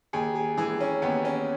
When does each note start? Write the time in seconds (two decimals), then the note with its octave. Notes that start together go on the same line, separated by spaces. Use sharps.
0.13 D#2 G#4
0.35 G#4
0.58 E3 G#4
0.80 C#4
1.02 D#2 B3
1.25 C#4